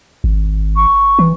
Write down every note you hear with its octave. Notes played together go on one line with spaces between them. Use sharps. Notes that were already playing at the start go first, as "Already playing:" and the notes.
G#1
C#6
E3